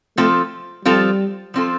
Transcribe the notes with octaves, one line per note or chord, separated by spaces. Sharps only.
F3 A3 C4 F4 A4
F3 G3 C4 F4 A4
F3 C4 F4 A4